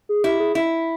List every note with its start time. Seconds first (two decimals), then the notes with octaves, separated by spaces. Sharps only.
0.09 G#4
0.24 E4 G4
0.40 G#4
0.55 E4